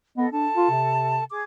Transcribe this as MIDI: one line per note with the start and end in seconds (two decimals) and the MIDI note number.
0.17 0.26 59
0.17 0.29 69
0.17 0.29 75
0.32 0.47 62
0.32 1.23 69
0.32 1.23 81
0.56 0.66 65
0.70 1.22 48
1.30 1.43 68
1.30 1.43 86